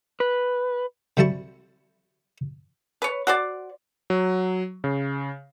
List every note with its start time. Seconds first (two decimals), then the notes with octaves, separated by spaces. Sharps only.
0.20 B4
1.17 C3 F#3 G3 E4 A5 C#6
3.02 B4 C#5
3.27 F#4 C5 D5
4.10 F#3
4.84 C#3